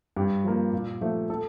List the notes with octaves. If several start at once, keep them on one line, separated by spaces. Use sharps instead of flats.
G2 G4
F3 A#3
A#2
F3 A3
A4